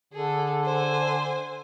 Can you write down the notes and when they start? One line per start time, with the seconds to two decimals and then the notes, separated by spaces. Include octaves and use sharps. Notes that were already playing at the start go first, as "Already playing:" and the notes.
0.13 D3 G#4 A4
0.64 C5 G#5